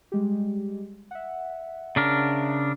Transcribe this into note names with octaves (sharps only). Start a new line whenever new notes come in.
G3 G#3 G4
E5 F#5
C#3 D4 A#4